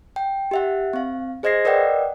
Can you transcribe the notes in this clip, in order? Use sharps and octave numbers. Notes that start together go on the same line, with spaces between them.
G5
G4 E5 F#5
C4 F5
G#4 C5 D#5 G#6 A#6 C7
A#4 B4 D5 D#5 F#5 G5